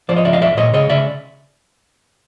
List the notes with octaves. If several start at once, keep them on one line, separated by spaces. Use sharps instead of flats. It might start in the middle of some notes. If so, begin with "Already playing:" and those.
F3 C5 D5
C#5 D#5
C#2 D5 E5
D#5 F5
B1 D5 E5
A#2 C#5 D#5
C#3 C#5 D#5
C#3 D5 E5